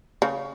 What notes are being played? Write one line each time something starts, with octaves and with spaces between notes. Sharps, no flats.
C#3